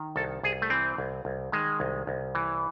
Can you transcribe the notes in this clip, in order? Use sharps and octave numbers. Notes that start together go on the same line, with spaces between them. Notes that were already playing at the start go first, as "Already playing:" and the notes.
Already playing: D#3
C2 A4
C2 G#4
A3
E3 C4
C2
C2
D#3 G#3
C2
C2
E3